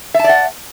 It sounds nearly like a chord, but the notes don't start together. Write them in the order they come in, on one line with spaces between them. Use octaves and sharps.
E5 A5 D5 F#5